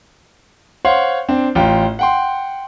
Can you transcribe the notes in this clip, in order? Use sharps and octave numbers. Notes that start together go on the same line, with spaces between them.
C5 C#5 F5 F#5 C6
C4 D4
A1 F4 G5
F#5 G5 C6